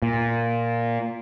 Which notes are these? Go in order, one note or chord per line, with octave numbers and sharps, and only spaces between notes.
A#2